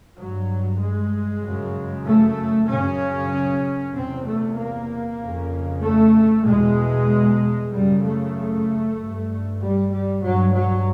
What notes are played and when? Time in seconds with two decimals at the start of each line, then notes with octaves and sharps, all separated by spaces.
0.16 G2 F#3
0.79 G#3
1.43 F#2 C#3
2.05 A3
2.68 F#2 C#3 C#4
3.94 E2 C3 C4
4.25 A3
4.57 A#3
5.19 F2 C#3
5.82 A3
6.45 E2 B2 G#3
7.71 F#2 C#3 G3
8.03 A3
8.97 G2
9.60 G3
9.91 G3
10.22 G2 F#3
10.54 F#3